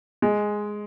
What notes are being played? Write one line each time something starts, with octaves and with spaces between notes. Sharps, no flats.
G#3